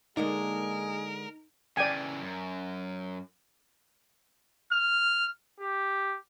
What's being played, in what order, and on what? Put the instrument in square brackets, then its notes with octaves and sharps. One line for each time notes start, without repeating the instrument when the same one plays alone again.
[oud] D3 G#3 A#3 [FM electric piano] D#4 [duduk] G#4 [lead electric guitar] A#4
[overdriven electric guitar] C#3 E3 [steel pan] D5 G5 G#5
[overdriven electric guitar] F#2
[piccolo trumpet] F6
G4